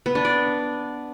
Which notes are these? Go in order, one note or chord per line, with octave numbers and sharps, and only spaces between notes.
B3
D4
D5